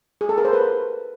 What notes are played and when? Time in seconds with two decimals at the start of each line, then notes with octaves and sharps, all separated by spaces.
0.21 G#4
0.29 A4
0.38 A#4
0.45 C5
0.53 B4